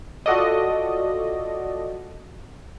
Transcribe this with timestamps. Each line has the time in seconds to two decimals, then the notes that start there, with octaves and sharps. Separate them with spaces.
0.26 F4 F#4 A4 D5 D#5